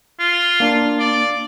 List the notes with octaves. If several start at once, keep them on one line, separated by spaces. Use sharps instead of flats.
F4
A#3 D4
D5